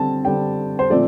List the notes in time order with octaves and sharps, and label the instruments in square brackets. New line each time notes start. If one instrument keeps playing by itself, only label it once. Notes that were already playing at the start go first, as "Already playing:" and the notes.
Already playing: [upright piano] D3 G3 C4 A5
D3 G3 C4 G5
C5
A#2 F3 A3 C4 D5